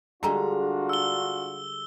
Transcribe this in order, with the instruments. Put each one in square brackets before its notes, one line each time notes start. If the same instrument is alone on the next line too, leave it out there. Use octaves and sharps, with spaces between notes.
[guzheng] D3 G3 G#3 [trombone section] D4 F4 F#4 [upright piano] A#5
[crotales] E6 G7